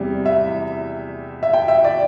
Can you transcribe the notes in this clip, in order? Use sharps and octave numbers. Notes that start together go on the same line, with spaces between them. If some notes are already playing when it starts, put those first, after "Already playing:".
Already playing: E2 C3 G3
E5
E5
G5
E5
D5